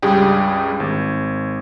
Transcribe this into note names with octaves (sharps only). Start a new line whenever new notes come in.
C#2 G2 G3 G4 G#4 G5
G#1